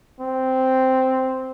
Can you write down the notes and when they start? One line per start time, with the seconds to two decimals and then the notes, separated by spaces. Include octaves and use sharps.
0.20 C4